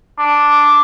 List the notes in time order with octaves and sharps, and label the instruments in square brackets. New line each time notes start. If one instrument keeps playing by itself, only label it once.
[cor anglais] D4